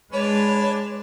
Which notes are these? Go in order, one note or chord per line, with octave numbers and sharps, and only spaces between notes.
G#3 D4 B4 C#5